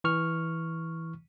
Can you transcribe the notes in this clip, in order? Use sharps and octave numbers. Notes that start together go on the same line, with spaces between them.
E3 C#6 F6